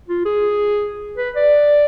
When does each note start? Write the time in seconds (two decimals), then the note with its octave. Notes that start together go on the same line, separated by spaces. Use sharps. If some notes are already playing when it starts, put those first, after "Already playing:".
0.09 F4
0.26 G#4
1.17 B4
1.36 D5